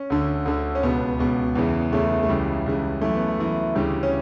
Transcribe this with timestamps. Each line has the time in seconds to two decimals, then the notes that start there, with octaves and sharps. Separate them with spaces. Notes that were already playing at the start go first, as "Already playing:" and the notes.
Already playing: C#4
0.10 D2 D3
0.46 D2 D3
0.75 C#4
0.83 C#2 B2 B3
1.19 C#2 B2
1.55 E2 C#3 E3
1.92 E2 C#3 E3 A3
2.23 A3
2.29 C#2 C#3 E3 G3
2.66 C#2 C#3 E3
3.02 F#2 E3 A3
3.16 B3
3.28 A3
3.38 F#2 E3
3.75 D2 C#3 E3 G3
4.03 C#4